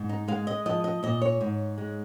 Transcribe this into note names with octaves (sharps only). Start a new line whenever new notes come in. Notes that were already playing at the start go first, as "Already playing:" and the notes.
Already playing: G#2
D#4
G#3 F5
D#5
F3 D#5
D#5
A#2 D#5
C#5
G#2
G#3